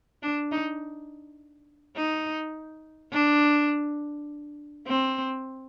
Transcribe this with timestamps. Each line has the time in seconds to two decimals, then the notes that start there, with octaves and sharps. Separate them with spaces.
0.22 D4
0.52 D#4
1.96 D#4
3.12 D4
4.87 C4